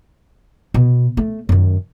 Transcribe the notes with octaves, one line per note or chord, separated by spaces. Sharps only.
B2
A3
F#2 D#3